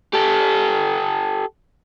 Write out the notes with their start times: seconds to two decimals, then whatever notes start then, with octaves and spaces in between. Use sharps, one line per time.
0.13 G4 A4